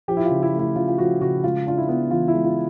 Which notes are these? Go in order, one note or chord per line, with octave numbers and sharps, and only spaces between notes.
F3 G4
E4
F4
C#3
E4
A3
E4
C#3 F4
F4
F3 F#4
C#3 F#4
G#3 F4
D4 F4
E4
B3
E3 F4
E4
G#3
F4